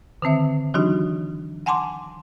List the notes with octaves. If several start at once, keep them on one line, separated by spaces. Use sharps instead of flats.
D3 D#3 C4 E5
E3 F#3 D4 D#4 F#4 G4
F#5 G#5 A5 C6 D6